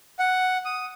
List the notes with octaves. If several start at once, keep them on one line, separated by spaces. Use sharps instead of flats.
F#5
D#6